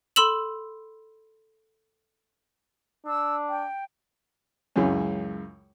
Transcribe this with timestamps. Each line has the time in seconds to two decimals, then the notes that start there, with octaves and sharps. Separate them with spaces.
0.16 A4 B5 C6 E6 E7 F#7
3.06 D4 E6
3.49 G5
4.76 C#2 F#2 E3 G#3 C#4